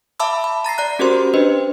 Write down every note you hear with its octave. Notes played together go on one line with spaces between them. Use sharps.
E5 A5 B5 D6 E6
B5
A#5 A6 A#6 C7
D5 A#5 F#6
C#4 F#4 G4 A#4 C5 C6
D4 B4 C5 D#5